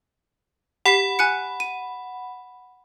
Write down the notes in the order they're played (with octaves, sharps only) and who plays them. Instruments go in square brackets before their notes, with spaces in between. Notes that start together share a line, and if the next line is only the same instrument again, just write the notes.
[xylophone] G4 B6 C7 [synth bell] F#5 B5
[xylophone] G#5 F#6 C#7
D#7